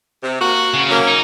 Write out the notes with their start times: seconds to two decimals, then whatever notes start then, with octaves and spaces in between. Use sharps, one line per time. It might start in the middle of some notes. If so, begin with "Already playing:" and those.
0.23 C3
0.40 A#3 F#4
0.74 C#3
0.89 F#3 A#3 C#4
1.07 D#4